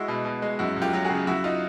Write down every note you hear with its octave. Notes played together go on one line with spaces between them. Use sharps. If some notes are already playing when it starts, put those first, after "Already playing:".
Already playing: G#3 E4 F#4
B2
B2
G#3
F#2 E4 F#4
F#2
F4 G4
F#3
F#4 G#4
C#3
F#2 E4 F#4
D#4 F4